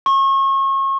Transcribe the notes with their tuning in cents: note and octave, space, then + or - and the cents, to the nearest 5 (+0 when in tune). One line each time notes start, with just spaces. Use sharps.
C#6 -35